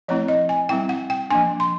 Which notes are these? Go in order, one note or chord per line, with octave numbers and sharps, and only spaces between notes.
F3 A3 C4 E4 C#5
D#5
G#5
G3 C4 E4 G5
F#5
G5
F3 A#3 D4 G#5
C6